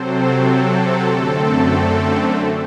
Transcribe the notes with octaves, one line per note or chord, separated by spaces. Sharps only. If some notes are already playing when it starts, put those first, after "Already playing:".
Already playing: C3 F#3 C4 A4 C5
A4
F#2 D3 A3 C4